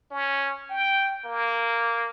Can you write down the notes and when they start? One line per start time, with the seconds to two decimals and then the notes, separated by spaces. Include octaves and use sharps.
0.11 C#4
0.70 G5
1.25 A#3